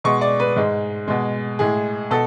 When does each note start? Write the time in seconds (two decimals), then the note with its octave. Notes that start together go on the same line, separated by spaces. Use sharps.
0.04 B2 G#3 C#6
0.21 D5
0.40 B4
0.56 G#2 G#3
1.08 B2 G#3
1.59 A2 G#3 G#4
2.11 B2 A4